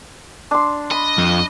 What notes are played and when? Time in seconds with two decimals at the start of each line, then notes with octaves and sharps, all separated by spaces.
0.51 D4 C6
0.91 D#5 B5
1.18 F2